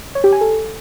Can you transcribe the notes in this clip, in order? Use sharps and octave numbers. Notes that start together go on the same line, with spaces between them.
C#5
G4
G#5
A4